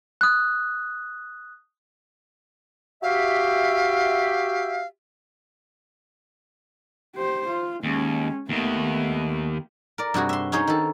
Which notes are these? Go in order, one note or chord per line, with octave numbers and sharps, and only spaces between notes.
D#6 F#6
F#4 G4 E5 F5
G4 C5
F4
D#2 G#3 C#4
D#2 D#3 A3 B3
A#4 D5
G2 C3 F#4 G#4
E5 C6
C#4 D#4 G#4 C5 C#5
D#3 A4